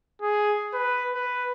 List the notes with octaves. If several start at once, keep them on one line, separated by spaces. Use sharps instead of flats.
G#4
B4
B4